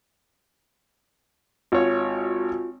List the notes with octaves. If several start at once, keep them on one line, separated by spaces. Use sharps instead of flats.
G#1 F4 F#4 C#5